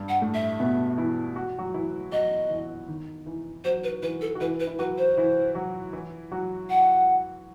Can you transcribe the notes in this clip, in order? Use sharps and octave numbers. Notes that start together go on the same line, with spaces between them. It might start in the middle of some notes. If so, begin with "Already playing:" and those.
Already playing: G2 G3
F#5
A2 A3
E5
B2 B3
E3 E4
F#4
F#3 F#4
E3 E4
F#3 F#4 D#5
E3 E4
D#3 D#4
E3 E4
F#3 F#4 C5
B4
E3 E4 B4
A4
F#4
E3 E4 B4
B4
E4
F#3 F#4 B4
C5
E3 E4
F#3 F#4
E3 E4
F#3 F#4
F#5